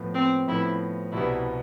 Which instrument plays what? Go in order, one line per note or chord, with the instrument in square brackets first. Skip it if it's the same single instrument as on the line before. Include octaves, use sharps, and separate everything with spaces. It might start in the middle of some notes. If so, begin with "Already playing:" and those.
Already playing: [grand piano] A2 F3 B3
[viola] C4
[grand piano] A2 F3 B3 [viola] E4
[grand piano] C2 B2 G3 B3 [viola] E4